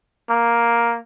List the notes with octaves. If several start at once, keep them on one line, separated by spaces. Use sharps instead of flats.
A#3